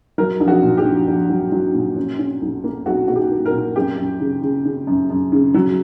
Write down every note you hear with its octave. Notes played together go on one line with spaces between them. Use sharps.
F#3 A#4
A#1
F#4
A#2
G4
A#1
A#1
F#3
F#3
A#2
C#4
C#4
B1
A#3
B1 F#4
A#2 F#4
G4
A#3
A#4
A#2
F#2 G4
F#2
C#3
C#3
C#3
F#2
F#2
C#3
F#3